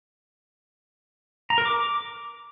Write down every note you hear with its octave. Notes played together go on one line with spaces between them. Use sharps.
A#5
A#4
D6